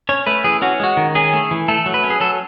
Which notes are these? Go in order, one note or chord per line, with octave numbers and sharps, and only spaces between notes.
C#4 C#5
A3 B4
E3 G#4
C#4 F#4
G#3 F#4
D#3
C#4 G#4
A3
E3
A3 A4
F#3
B4
C#4
G#4
F#3 A4